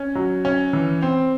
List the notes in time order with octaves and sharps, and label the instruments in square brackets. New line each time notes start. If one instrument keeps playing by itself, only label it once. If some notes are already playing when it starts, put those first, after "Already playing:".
Already playing: [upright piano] C#4
F#3
C#4
E3
C4